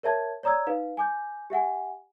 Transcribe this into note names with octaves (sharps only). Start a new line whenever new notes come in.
A#4 C#5 E5 A5 G#6
C#5 D5 A#5 D#6 E6 G#6
D#4 B4 F5
G#5 D6 G6
G4 E5 F#5 G#5